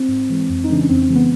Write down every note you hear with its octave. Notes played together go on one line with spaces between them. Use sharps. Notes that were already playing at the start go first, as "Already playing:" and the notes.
Already playing: C4
G#2
E3 G#3
F2
D#4
C#3 E3 G#3 D4
C#4
F2 C4
C4
C#3 E3 G#3
B3